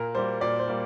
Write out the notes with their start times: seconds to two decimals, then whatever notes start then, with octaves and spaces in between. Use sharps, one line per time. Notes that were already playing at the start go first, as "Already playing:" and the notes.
Already playing: A#2 A#4
0.15 G3 A#3 C5
0.41 A#2 D5
0.59 C5
0.68 G3 A#3